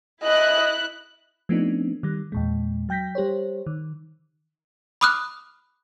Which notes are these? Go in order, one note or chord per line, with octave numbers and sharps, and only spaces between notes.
E4 D#5 F#6
F3 A3 B3 C4 D4 D#4
D#3 G3
E2 A#2 G#3
F#3 G5 G6 A#6 B6
G3 G4 C5 C#5
D#3
B5 D6 D#6 F6 F#6